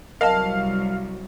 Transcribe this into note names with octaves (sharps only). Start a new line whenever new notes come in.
C2 F#3 A#4 D#5 F5 A5